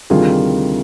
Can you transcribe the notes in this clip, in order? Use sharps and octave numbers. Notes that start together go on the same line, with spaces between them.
D2 C3 D#3 G3 F4 G#4